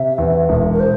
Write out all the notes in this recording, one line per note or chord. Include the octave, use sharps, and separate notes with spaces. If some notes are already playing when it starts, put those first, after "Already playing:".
Already playing: C3 E5
E2
E1
A#4
C5